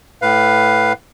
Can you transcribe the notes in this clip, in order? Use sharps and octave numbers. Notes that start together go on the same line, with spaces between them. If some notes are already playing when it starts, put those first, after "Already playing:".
A2 B4 F5